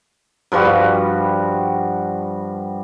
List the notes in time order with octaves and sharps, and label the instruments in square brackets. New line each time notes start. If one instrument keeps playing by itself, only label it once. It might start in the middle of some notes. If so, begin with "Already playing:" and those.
[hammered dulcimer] G2 F3 G3 F#4